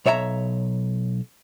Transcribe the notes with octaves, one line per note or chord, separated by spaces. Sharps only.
B1 C#5 E5 F#5 A#5